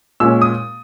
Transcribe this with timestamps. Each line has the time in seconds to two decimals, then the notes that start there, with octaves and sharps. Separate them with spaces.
0.20 A#2 G#3 C#4 E6
0.42 D#6